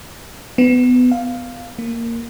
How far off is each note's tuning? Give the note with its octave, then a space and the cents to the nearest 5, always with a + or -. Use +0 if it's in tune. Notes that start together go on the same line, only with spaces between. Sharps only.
B3 +20
F5 +0
A#3 -10